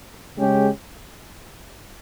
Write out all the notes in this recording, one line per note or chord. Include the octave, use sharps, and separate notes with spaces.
C#3 G#3 C#4 G4